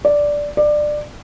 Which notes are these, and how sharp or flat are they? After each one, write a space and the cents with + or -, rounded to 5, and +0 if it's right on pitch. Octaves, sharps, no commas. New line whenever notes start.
D5 -5
D5 +20